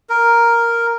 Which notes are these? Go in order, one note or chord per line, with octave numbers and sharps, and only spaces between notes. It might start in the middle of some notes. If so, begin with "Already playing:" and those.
A#4